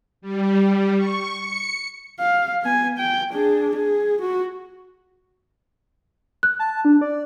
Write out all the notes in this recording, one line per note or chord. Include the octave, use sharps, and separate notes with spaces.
G3
C#6
C#7
F5
B3 G#5
G5
D4 G#4
G#4
F#4
F#6
A5
D4
D5